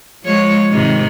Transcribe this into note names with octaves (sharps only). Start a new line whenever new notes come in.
F3 G#3 C#5
G#2 C3 D#3